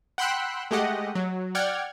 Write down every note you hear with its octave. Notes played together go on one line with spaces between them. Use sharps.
F#5 G5 B5 C6 E6 F#6
G#3 A3 G4 D#5 F#5
F#3
D5 F#5 G5 F6 G#6